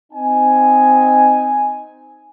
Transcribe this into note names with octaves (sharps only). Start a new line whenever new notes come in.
C4 D#4 G#5